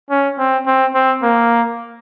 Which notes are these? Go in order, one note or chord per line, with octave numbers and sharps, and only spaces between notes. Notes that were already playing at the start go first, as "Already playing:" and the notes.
C#4
C4
C4
C4
A#3